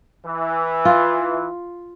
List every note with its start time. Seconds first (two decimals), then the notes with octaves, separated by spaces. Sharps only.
0.25 E3
0.85 F4